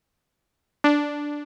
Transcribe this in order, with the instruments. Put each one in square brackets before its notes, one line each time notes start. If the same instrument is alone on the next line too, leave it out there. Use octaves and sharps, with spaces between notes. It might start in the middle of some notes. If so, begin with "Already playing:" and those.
[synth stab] D4